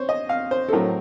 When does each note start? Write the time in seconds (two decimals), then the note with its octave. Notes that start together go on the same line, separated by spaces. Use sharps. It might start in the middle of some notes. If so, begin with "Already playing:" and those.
Already playing: C4 C5 C#5
0.09 D#5
0.29 F5
0.51 C5
0.69 A4
0.72 A2 F#3 C4 A#4